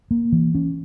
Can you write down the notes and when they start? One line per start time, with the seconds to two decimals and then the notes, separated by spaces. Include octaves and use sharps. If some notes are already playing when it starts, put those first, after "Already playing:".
0.11 A#3
0.32 E3
0.55 C#4